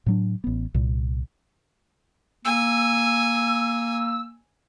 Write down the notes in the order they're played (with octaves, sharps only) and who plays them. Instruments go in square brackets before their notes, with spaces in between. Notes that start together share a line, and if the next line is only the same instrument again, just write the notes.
[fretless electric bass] A2 F#3 D4
A1 B3
C2 A#2
[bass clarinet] A#3 [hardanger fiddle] G#5 [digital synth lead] E6